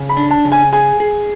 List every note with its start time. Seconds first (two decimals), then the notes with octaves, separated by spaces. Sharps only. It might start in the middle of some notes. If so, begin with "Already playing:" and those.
Already playing: C#3
0.09 B5
0.17 D4
0.31 A5
0.45 C#3
0.52 G#5
0.72 G#4 G#5
1.00 G#4